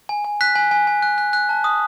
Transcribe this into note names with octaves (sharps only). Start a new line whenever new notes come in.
G#5
G#5
F#6 B6
G#5
G#5
G#5
F#6
F#6
F#6
A5
D#6